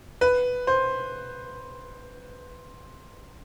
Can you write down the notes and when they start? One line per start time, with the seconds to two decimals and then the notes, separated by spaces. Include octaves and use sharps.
0.21 B4
0.67 C5